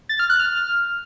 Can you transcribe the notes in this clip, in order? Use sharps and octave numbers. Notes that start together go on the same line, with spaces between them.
A6
F6
F#6
F6